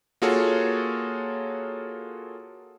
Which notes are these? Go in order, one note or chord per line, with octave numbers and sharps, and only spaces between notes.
A#3 F4 F#4 G#4 A4 C#5